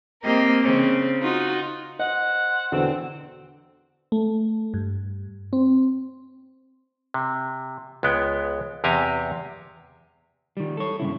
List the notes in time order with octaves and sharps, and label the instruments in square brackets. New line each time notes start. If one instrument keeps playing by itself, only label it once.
[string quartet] A#3 C4 G4 A#4 D#5
C#3 C4
D#4 F4 F#4
[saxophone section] C5 F#5 [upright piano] D#5
[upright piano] E2 B2 D3 [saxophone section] C4
[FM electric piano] A3
G2
C4
[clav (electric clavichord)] C3
C#2 G#3 B3 G5
E2 C3 G4 F5 G#5 A#5
[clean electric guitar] D#3 G3
A4 C#5
G2 A#2 C#3 E4